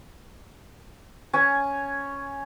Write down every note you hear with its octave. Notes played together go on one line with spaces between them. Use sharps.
C#4 G#5